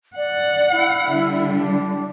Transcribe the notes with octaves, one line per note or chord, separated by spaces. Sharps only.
D5 F#5
E4
D3 G3
D4